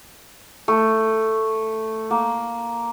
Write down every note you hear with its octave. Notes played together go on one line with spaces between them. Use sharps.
A3
A#3